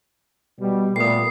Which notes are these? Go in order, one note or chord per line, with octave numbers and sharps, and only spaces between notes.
B2 G3
A#2 G3 A3 B3 D#6 C7